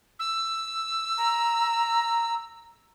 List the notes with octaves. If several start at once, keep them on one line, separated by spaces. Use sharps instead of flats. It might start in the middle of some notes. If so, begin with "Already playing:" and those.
E6
A#5